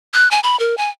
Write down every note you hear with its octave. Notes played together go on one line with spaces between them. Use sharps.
F#6
G#5
B5
A#4
G#5